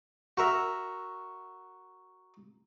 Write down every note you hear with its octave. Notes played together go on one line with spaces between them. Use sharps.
F#4 A#4 E5